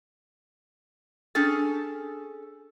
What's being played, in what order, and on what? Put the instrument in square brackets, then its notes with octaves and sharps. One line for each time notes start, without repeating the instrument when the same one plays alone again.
[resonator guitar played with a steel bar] C#4 G#4 A4 [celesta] D4 A6